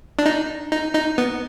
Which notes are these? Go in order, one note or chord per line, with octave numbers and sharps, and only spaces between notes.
D4
D#4
D#4
D#4
B3